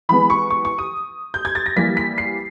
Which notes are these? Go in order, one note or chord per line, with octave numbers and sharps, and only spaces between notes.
E3 G#3 B3 B5
C#6
C#6
C#6
D#6
G6
G#6
A6
A#6
E3 G3 A#3 B6
B6
C7